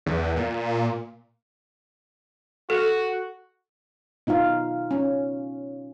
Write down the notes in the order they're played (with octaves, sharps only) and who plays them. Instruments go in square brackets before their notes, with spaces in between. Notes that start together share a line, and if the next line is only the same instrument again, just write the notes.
[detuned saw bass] E2
A#2
[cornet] F#4 [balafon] A4
[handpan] B2 D#4 F4 F5
C#4